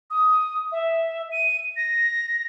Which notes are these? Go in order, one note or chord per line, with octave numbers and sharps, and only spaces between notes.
D#6
E5
D#7
A#6